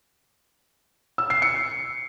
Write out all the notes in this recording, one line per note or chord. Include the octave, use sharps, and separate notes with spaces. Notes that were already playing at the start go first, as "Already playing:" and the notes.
E6
C7
C#7